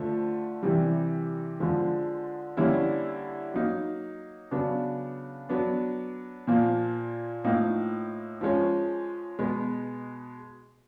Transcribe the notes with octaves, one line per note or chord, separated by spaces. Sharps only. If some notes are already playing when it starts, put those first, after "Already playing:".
Already playing: D3 F3 A3
C3 E3 G3
D3 F3 G#3
D3 G3 A#3 C#4 E4
F#3 A#3 D#4
C#3 F#3 B3 D4
F#3 B3 D4
A#2 F3 A#3
A2 F3 A#3 D#4
F3 G#3 C#4
B2 G#3 B3